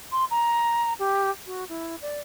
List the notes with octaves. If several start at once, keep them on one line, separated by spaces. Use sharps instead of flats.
C6
A#5
G4
F#4
E4
D5